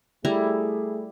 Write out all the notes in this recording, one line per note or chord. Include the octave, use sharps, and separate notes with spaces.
G3 A3 E4 G#4 A#5